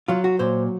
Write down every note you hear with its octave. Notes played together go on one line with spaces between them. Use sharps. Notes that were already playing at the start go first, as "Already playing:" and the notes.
F#3 F4
F#4
A#2 C5